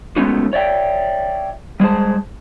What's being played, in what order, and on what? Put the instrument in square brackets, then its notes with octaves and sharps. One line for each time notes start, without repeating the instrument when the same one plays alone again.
[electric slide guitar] G#3 A3 B3 C#4 D#4 F#4
C#5 D5 E5 G5
G3 G#3 G#4 C5 A5